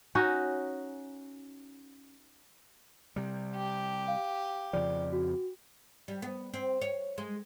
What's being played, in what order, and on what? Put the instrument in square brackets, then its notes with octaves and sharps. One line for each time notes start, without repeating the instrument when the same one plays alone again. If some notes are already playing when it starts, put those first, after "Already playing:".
[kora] C#4 D#4 F#4 D#5
[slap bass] C3 G3
[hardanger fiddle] G4
[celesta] F5
[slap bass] F2 C#3 F3 [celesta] D5
[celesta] F#4
[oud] G3
B3
C4
C#5
G#3